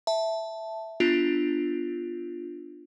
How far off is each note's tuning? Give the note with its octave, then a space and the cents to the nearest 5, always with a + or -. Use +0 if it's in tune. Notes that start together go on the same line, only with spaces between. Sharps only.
E5 +0 A5 +0
B3 +0 D4 +15 F4 +0